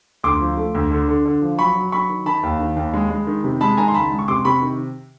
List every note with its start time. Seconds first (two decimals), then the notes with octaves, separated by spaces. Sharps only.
0.23 D2 C6 D6
0.41 F3
0.57 A3
0.75 D2
0.91 D3
1.08 D3
1.25 D3
1.42 F3
1.59 F#3 B5 C#6
1.75 F#3
1.92 F#3 B5 C#6
2.09 D#3
2.26 D#3 A5 B5
2.43 D#2
2.60 D#3
2.76 D#2
2.94 G#3
3.10 G#3
3.27 D#3
3.44 C3
3.61 G#3 A5 B5
3.77 D#3 G#5 A#5
3.88 C6
3.94 C#2 A5 B5
4.11 G#3
4.19 C#6
4.28 C3 C6 D6
4.45 C3 B5 C#6
4.62 D#3